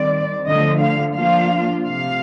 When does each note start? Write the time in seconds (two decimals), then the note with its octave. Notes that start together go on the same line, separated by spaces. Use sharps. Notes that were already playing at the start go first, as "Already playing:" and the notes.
Already playing: D#3 G3 C4 D5
0.47 D3 F3 A3 D#5
0.82 F5
1.16 F3 A#3 D4 F4 F5
1.86 C3 F3 A3 F5